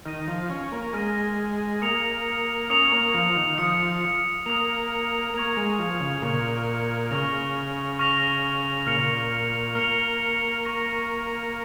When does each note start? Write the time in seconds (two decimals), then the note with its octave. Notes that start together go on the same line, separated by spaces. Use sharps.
0.05 D#3 F6 A#6 D#7
0.28 F3
0.50 C#4
0.72 A#3
0.93 G#3 F6 A#6 D#7
1.82 A#3 D#6 C#7 F7
2.70 C#4 D#6 C#7 F7
2.92 A#3
3.14 F3
3.36 D#3
3.58 F3 D#6 C#7 F7
4.46 A#3 D#6 C#7 F7
5.34 A#3 C#6 G#6 C#7 F7
5.57 G#3
5.79 F3
6.00 C#3
6.22 A#2 C#6 G#6 C#7 F7
7.11 C#3 C#6 F6 A#6 F7
7.99 C#6 F6 A#6 F7
8.87 A#2 F6 C#7 F7
9.75 A#3 F6 C#7 F7
10.64 C#6 A#6 F7